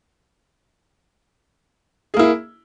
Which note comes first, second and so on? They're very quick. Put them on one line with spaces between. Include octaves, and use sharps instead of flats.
G#4 A#3 E4